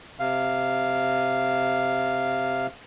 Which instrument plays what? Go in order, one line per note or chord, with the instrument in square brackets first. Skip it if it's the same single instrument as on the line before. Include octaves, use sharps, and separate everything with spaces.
[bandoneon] C3 F5